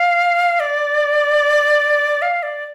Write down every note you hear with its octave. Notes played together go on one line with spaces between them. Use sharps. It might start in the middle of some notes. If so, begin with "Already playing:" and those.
Already playing: F5
D5
F5
D5